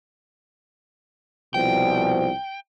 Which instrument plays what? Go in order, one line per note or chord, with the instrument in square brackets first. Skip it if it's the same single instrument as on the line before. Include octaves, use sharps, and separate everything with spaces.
[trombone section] C2 B2 F3 [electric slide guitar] G5